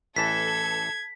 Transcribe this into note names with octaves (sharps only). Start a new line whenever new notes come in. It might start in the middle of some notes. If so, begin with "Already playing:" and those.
A1 E3 A4 A5 G#6 B6